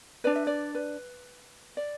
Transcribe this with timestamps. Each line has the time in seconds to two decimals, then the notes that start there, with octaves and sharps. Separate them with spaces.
0.24 D4 B4 D5
0.36 E5
0.47 D5
0.75 B4
1.77 D5